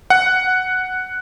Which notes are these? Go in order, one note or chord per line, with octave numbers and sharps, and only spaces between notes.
F#5